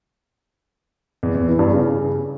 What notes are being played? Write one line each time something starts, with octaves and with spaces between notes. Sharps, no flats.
E2
E2
E3
G2
C#3